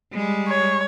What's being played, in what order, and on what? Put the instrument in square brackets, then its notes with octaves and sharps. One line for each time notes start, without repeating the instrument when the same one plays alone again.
[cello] G3 G#3
[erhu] C#5